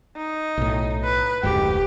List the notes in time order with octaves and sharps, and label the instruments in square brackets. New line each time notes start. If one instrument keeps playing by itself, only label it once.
[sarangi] D#4
[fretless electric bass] B1 A2
[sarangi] B4
[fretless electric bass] F1 D2 G#2 [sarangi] G4